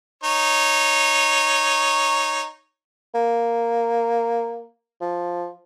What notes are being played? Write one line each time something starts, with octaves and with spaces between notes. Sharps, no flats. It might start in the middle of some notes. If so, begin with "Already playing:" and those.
D#4 C#5
A#3
F3